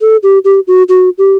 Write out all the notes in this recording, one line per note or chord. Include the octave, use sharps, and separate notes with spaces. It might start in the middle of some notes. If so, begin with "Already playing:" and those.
A4
G4
G4
F#4
F#4
G4